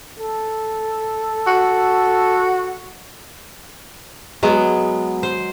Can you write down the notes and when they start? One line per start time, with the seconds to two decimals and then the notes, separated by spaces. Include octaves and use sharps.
0.20 A4
1.47 F#4
4.43 F#3 G#3 B3
5.23 C5